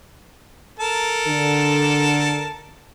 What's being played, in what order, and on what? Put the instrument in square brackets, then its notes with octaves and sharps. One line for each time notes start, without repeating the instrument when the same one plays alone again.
[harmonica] A4 A#4 A5
[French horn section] D3